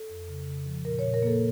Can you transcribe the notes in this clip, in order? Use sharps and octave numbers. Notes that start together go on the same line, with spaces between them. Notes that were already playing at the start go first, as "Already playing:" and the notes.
Already playing: A4
F2
C#3
C#3
F3
A#2 A#4
A#2 C#5
A#4
A#3 A4